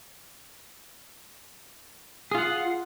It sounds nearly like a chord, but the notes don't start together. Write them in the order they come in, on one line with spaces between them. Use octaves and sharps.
G#4 F4 F#5